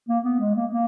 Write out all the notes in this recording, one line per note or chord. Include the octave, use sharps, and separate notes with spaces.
A#3
B3
G#3
A#3
A#3